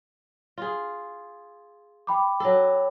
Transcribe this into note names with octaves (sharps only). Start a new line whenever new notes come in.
F4 G#4
G5 B5 D6
F#3 A4